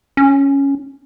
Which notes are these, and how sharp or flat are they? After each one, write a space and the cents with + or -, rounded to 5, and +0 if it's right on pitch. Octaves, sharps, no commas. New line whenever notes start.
C#4 +0